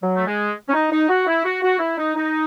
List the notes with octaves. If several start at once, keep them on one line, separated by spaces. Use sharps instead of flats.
F#3
A3
G#3
C#4
D#4
D#4
F#4
E4
F#4
F#4
E4
D#4
D#4